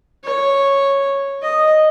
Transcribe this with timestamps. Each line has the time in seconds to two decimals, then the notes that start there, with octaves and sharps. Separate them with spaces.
0.24 C#5
1.42 D#5